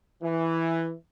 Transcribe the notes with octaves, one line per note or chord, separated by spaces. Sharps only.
E3